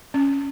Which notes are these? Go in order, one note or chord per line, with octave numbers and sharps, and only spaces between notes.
C#4